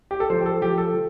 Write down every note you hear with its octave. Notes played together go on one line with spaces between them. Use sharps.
G4
A4
F3 C5
G4
A4
F3 G4
A4
F3